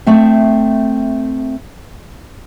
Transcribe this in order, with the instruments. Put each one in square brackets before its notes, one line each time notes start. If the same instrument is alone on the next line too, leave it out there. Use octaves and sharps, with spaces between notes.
[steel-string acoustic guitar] A3 C4 E5